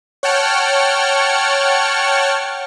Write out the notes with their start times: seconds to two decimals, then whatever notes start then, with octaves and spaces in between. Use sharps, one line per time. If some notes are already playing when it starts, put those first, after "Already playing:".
0.23 C#5 F#5 G5 A5 F6 C#7